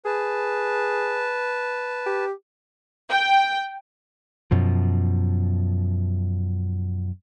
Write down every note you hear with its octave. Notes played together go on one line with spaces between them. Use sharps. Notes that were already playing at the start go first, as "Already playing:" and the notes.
G#4 B4 A5
G4
G5
F#2 B2 F3